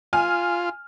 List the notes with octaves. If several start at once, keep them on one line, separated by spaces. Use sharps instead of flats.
F4 G#5 F6